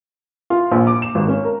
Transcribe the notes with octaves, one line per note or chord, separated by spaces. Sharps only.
F4
A#1
D6
E7
G#1
C#4
A#4